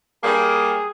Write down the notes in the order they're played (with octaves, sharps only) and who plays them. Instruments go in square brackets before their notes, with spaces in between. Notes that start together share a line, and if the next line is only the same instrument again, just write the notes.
[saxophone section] G3 A#3 [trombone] G#4